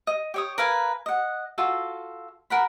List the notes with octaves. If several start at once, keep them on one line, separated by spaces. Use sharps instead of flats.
D#5
G4 C#5 D#6
A#4 B4 F5 G#5
D#5 F#5
F4 F#4 A4
A#4 F#5 B5